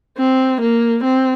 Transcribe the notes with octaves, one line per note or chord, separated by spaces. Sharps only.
C4
A#3
C4